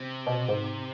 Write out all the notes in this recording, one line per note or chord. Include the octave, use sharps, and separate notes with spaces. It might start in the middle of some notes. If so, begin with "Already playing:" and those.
Already playing: C3
B2
G#2